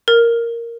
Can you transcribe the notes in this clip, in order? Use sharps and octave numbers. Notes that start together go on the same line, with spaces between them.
A#4